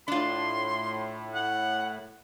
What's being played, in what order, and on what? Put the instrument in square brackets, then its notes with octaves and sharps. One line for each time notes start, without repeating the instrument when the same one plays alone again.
[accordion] A2 [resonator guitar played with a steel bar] D4 F4 [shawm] C6
[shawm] F#5